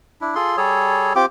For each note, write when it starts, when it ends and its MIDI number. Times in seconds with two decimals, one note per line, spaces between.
0.21 0.35 62
0.21 0.35 64
0.35 0.57 65
0.35 0.57 68
0.35 0.57 69
0.35 0.57 84
0.57 1.13 55
0.57 1.13 68
0.57 1.13 69
0.57 1.13 73
1.16 1.26 60
1.16 1.26 65
1.16 1.26 67
1.16 1.26 86